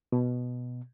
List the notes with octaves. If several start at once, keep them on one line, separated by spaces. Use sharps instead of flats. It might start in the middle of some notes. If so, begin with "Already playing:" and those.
B2